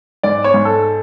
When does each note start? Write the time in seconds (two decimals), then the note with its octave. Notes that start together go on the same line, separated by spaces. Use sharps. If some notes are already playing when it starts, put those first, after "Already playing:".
0.23 G#2 D5
0.44 C#5
0.54 G#2
0.65 A4